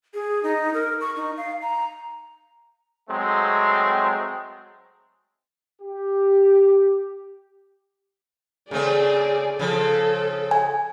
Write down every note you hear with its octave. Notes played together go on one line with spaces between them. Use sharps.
G#4
D#4
A#4
C#6
D#4
F5
A#5
F#3 G#3 A3 C4
G4
C#3 A3 C4 G#4 D5
C#3 F3 A4
G#5